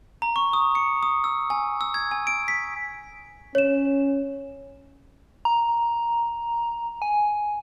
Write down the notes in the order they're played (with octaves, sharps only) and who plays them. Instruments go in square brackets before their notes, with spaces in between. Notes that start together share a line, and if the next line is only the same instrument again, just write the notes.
[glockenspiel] A#5
C#6
D#6
C#7
D#6
E6
G#5
E6
G#6
G#5
D7
B6
[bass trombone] C#4 [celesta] C#5 E7
[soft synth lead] A#5
G#5